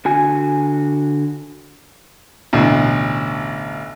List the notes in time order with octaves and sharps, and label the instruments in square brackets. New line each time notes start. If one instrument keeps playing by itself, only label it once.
[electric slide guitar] D3 F#4 G#5
[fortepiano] A1 D2 B2